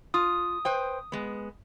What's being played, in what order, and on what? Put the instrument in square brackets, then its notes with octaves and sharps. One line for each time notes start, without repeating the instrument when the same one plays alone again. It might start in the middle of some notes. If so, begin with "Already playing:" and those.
[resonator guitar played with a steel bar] F4 [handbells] D#6
[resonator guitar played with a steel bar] B4 C5 G5
G#3 B3